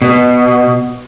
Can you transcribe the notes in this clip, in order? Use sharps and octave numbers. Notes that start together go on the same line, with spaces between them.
B2